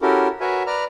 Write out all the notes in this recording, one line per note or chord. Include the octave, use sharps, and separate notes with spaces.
C#4 E4 F#4 G4 A4 A#4
F#4 A#4 B4 C#5 E5 G#5
B4 D5 A#5 F6